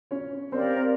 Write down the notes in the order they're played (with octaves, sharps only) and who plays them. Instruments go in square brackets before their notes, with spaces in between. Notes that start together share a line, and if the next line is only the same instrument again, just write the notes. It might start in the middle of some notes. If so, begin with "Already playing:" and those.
[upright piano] C#4 C#5
[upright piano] C4 C5 [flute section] G4 A#4 D5 F5